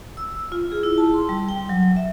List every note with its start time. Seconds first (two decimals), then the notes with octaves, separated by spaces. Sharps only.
0.17 E6
0.52 F4
0.72 G#4
0.83 E4
0.98 A5
1.14 C6
1.29 G3
1.48 G5
1.69 F#3
1.96 E5